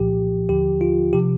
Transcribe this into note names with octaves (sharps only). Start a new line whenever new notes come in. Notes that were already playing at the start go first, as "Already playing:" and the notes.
Already playing: C2 A#2 F3 G4
D#2 D3 F3 G4
F4
C3 F3 G4